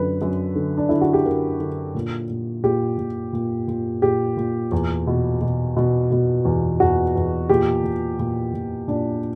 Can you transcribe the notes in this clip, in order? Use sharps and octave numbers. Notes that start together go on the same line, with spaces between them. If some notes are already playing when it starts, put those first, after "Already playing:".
Already playing: F#2 D3 B4
F#2
D3
D4
D3 E4
F#4
G4
D3 A#4
D3
A#2
A#2
A#2 G4
A#2
A#2
A#2
A#2 G4
A#2
E2
B2
B2
B2
B2
E2
E2 F#4
E2
A#2 G4
A#2
A#2
A#2
A#2 D4